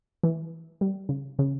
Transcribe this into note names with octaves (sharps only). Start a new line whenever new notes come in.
E3
G3
C#3
C#3